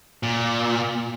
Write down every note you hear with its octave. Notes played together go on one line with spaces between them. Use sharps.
A#2